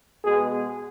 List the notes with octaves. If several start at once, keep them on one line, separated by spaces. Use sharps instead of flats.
B2 G#3 B3 G#4